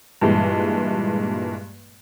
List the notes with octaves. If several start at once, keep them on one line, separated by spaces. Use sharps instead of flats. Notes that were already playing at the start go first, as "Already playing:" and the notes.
G2 A#2 E3 G#3